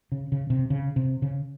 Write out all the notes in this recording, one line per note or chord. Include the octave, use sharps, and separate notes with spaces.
C#3
C#3
C3
C#3
C3
C#3